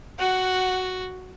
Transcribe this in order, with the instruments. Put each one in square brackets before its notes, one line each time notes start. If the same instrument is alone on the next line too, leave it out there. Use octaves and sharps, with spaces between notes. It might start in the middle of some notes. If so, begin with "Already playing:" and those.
[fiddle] F#4 [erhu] F#5